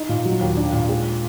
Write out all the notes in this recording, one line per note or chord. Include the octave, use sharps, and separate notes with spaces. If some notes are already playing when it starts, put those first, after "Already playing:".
Already playing: D#4
A#2
F#3
D#2
D4
A#2
G#3